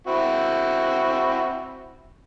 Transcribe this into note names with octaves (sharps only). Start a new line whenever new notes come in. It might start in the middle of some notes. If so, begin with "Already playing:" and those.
C4 E4 F#4